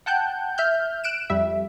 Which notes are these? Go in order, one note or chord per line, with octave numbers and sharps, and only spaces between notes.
F#5 G5 A5 F#6 G6
E5 F6 G6
F#6 D7 E7
F2 G3 E5